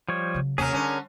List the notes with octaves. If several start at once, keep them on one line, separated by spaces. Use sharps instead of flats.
F3 G3 C#5
C#3 F#3
D#2 C3 F#3 C#4 G#4 A#4
D3 G3 C#4